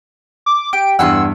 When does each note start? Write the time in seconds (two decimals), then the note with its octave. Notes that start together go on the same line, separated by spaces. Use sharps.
0.46 D6
0.73 G4 D7
0.99 E2 G2 F#5 G#5 C6 E6